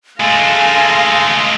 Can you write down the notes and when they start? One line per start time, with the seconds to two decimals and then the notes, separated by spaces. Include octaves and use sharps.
0.20 G#3 A3 F5 G#5 C6 A#6